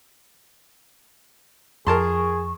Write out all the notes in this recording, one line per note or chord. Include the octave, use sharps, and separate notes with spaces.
F2 G#4 A#4 A5 C6 C#6